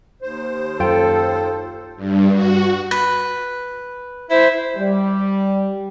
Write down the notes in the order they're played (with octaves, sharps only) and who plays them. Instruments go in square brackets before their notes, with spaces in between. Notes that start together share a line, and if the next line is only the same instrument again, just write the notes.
[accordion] D#2 C5
[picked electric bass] F#2 [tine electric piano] F4 G5 [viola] A4
[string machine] G2
F#4
[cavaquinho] B4
[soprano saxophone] E4 [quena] C5
[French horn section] G3